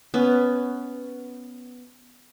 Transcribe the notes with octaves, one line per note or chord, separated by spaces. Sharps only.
B3 C#4